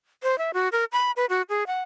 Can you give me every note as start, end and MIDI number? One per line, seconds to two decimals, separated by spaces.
0.23 0.38 72
0.38 0.51 76
0.54 0.69 66
0.72 0.85 70
0.92 1.11 83
1.16 1.26 71
1.30 1.42 66
1.49 1.64 68
1.67 1.82 78